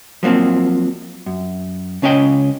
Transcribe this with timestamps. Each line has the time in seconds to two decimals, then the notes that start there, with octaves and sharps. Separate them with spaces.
0.23 F3 F#3 A#3 C4
1.26 F#2
2.02 C#2 C#4 C#5 D#5 G5